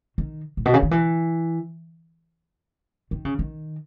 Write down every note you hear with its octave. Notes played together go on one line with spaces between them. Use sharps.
D#3
A2
B2
C#3
D#3
E3
D#3
C#3
D#3